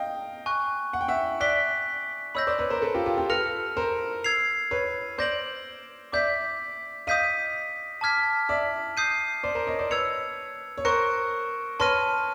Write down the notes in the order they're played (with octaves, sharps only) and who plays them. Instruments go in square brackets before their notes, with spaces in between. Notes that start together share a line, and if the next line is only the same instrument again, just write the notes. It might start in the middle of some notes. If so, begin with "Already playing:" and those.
Already playing: [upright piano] D#5 F5 G5
[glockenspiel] G#5 C#6 F#6
[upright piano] F#5
G5
E5 F#5
[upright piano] D5 E5 [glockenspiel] F#6 B6 D7 G7
[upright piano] C#5 D#5 [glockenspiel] B5 E6 G6 A#6
[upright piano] C5 D5
B4 C#5
A#4 C5
A4 B4
F4 G4
F4 G4
F4 G4
[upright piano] A4 B4 [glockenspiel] F6 A#6 C#7 F7
[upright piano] A#4 C5
[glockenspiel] E6 G#6 C7 F7
[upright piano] B4 C#5
[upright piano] C5 D5 [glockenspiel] G6 A#6 D7 F#7
[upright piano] D5 E5 [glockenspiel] D6 G6 B6
[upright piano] D#5 F5 [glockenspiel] D#6 G6 B6 D#7
[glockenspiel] A5 D6 F6 G#6 B6
[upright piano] D5 E5
[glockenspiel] D#6 G6 C7 D#7
[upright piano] C5 D5
A#4 C5
C#5 D#5
C5 D5
[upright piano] B4 C#5 [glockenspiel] E6 G#6 C#7 F7
[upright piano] C#5
[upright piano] A#4 C5 [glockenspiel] C#6 F#6 A#6 C#7
[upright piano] B4 C#5 [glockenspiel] A5 C6 F6 A#6 D#7